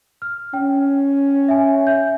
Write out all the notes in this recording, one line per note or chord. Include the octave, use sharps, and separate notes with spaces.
F6
C#4 G5
E5 G#5
E5 G6